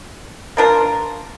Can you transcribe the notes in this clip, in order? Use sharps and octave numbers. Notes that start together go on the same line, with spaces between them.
A#3 D4 F4 A#4